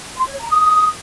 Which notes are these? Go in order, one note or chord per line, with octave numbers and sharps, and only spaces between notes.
C6
C#5
A#5
D#6